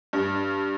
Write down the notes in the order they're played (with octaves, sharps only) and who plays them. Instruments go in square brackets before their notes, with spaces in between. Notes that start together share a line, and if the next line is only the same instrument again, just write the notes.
[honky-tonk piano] G2